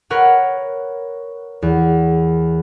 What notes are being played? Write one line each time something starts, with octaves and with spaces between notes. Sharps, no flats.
A#4 B4 C#5 F#5
E2